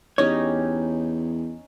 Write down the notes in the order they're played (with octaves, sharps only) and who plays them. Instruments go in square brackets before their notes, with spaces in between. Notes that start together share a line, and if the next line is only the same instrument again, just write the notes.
[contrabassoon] E2 [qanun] C#4 D#4 G4 [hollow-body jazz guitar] C#5